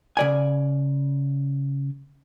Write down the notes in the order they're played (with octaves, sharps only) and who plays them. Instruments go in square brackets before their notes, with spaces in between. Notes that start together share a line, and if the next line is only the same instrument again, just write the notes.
[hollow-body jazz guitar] C#3 D5 G#5